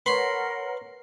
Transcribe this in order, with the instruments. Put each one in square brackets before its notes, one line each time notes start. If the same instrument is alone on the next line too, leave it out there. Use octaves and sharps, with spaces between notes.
[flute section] A#4 F#5 [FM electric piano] B4 C#5 [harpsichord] B5 C6